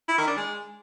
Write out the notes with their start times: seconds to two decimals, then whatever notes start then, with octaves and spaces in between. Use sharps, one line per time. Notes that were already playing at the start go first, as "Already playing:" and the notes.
0.08 E4
0.18 D#3
0.27 D4
0.37 G#3